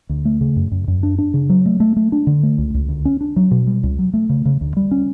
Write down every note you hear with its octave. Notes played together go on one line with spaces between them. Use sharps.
D2
A3
C#3
F#2
F#2
F#2
D4
D4
C#3
F#3
A3
A3
A3
D4
D3
A3
C#2
C#2
D2
C#4
D4
F#3
B2
G3
C#2
F#3
A3
C#3
C#3
D2
G3
C#4